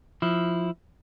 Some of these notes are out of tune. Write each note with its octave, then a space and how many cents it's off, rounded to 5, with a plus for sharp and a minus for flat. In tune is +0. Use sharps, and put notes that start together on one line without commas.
F3 +0 E4 +0